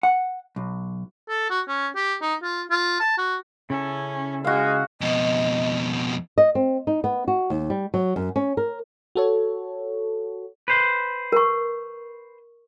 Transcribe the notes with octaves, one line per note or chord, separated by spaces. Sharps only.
F#5
B1
A4
F#4
C#4
G4
D#4
F4
F4
A5
F#4
C#3 C#4 E4 A4
G#3 F#4 F5
F2 B2 D#5
D#5
C4
D#4
B3
F#4
D#2
G3
F#3
F#2
C#4
A#4
F#4 A4 C#5
B4 C5
A#4 C#6